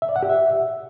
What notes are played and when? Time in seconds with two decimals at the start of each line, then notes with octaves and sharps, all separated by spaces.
0.02 E5
0.09 D5
0.16 F#5
0.23 G4
0.29 E5